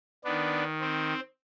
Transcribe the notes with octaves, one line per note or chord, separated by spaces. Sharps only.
D#3 B3 D4
C4